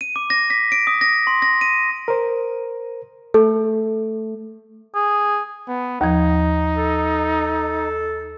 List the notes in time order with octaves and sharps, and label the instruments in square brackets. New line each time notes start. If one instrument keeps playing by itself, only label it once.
[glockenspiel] D#7
D6
A#6
B6
D7
D#6
A#6
C6
A#6
D#7
[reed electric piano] A#4 C5
[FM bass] A3 [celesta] A4
[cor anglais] G#4
[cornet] B3
[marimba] D#2 F3 [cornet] D#4
[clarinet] A4